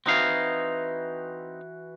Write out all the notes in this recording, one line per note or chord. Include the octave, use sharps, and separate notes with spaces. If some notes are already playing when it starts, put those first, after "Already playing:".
E3 C4 D#4 F#4 F5